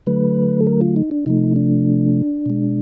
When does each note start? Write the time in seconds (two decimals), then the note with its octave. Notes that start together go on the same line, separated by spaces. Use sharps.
0.07 D3 F#3 A3 B4
0.61 A4
0.67 A#4
0.81 F4
0.96 D#4
1.11 D4
1.26 C3 F3 A3 D#4
1.56 D4
2.46 B2 G#3